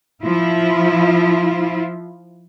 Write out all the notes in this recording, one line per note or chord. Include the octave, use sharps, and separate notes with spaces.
F3 E4 F4